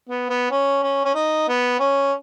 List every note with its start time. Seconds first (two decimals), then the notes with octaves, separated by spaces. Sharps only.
0.09 B3
0.30 B3
0.51 C#4
0.83 C#4
1.04 C#4
1.15 D#4
1.48 B3
1.79 C#4